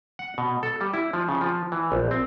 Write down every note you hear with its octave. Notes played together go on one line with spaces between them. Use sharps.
F#5
B2
A4
G3
E4
F3
C#3
F3
E3
A#1
C4